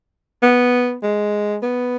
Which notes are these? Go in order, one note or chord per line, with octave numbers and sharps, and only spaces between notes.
B3
G#3
B3